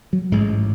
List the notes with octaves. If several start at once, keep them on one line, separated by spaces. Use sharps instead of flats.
F#3
A1 G#2 G#3